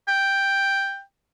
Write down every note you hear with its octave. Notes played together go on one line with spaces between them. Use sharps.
G5